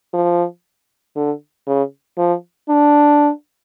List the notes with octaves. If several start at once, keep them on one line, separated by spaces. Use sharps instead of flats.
F3
D3
C#3
F3
D4